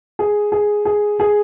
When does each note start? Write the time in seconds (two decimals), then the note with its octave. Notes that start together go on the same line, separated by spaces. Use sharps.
0.19 G#4
0.52 G#4
0.85 G#4
1.20 G#4